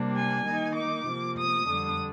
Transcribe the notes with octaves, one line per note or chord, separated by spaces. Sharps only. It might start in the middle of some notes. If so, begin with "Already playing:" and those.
Already playing: C3 G3 A#3 D4
G#5
D#3 A#3 D#4
D6
C3 F3 A#3
D#6
F2 D3 G3 D4